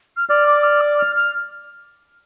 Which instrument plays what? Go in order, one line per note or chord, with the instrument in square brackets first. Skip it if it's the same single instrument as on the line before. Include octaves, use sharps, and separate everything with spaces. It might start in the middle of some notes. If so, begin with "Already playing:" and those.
[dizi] F6
[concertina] D5 [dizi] F6
[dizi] D6
F6
D6
F6
F6